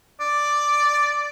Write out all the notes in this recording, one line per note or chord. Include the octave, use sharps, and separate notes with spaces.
D5